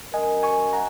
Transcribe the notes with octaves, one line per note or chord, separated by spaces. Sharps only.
F#3 C#4 A#4 D#5 G#5
G#5 C#6
F#5 A#5